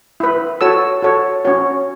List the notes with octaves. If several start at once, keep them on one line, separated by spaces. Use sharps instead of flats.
E4 B4
F#4 A4 C#5 E6
F#4 A4 C#5
C#4 F#4 C#5